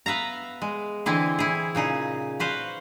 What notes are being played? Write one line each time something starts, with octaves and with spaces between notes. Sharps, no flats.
B3 B4 E5 F5 A#5
G#3
D3 E3 C4 E4 G#4
E4 G#4
A#2 C#3 D#4 G#4
F#4 B4 C5 F5